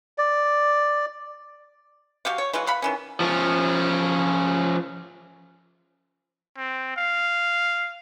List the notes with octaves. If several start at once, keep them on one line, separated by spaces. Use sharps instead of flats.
D5
F3 F#4 G4 F5
C#5
E3 G#3 F4 F#4
F5 F#5 B5
D#3 E3 C#4
F3 C#4
C4
F5